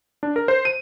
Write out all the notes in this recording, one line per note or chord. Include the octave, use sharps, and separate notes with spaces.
D4
A#4
C5
D#7